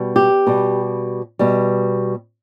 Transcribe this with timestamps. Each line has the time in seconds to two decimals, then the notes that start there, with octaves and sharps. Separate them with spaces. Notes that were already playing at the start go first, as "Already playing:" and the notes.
Already playing: B2 G3
0.16 G4
0.47 B2 G3
1.39 B2 G3